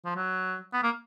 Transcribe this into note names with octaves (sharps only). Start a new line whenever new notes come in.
F3
F#3
B3
A#3